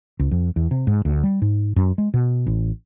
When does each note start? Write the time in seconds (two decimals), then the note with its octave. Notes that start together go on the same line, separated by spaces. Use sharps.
0.19 C#2
0.31 F2
0.56 E2
0.71 C3
0.87 G#2
1.05 D2
1.24 G3
1.42 G#2
1.76 F#2
1.98 G#3
2.14 B2
2.47 A1